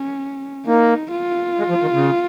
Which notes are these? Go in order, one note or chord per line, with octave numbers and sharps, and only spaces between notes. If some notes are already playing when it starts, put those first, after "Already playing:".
Already playing: C#4
A#3 D#4
F4
G#3
F3
D#3
C#3